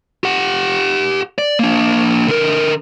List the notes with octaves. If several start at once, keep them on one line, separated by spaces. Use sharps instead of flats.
G4 F#5
D5
A#3 D4
D3 A#4